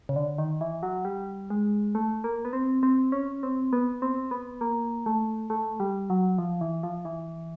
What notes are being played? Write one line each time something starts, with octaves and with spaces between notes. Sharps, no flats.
C#3
D3
D#3
E3
F#3
G3
G#3
A3
A#3
B3
C4
C4
C#4
C4
B3
C4
B3
A#3
A3
A3
G3
F#3
F3
E3
F3
E3